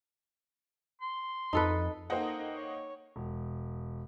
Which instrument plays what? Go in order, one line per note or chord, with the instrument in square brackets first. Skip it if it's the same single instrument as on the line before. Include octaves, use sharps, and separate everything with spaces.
[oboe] C6
[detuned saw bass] F2 [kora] D#4 A4 B4
[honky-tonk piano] A#3 D#5 G5 [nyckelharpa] D#4 A4 [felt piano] C5 F#5
[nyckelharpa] C#5
[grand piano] E1